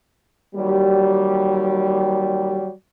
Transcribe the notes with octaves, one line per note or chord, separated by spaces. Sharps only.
D#2 F#3 G3